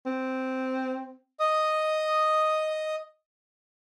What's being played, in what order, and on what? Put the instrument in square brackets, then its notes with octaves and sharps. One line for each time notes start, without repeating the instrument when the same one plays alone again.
[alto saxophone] C4
[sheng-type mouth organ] D#5 D#6